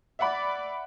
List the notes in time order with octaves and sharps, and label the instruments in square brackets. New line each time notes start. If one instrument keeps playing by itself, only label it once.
[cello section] D5 [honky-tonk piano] E5 F#5 B5